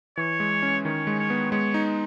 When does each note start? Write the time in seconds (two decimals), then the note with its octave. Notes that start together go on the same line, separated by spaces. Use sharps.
0.17 E3 C#5
0.40 G#3
0.63 C#4
0.85 D#3 C#5
1.07 G#3
1.19 C#5
1.30 B3
1.51 G#3 C#5
1.74 D#4